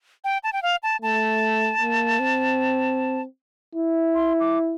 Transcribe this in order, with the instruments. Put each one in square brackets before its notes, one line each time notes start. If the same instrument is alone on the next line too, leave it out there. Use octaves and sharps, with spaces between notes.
[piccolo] G5
A5
G5
F5
A5
[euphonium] A3 [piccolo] A5
[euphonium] A#3
C4
E4
[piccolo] C6
D6